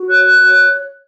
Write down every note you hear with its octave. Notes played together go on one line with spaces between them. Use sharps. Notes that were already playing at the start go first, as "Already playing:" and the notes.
Already playing: F#4
C#5 F#6
F#4